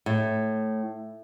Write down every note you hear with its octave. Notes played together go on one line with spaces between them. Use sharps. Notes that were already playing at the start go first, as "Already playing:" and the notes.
A2